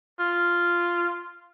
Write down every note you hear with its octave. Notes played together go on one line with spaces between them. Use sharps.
F4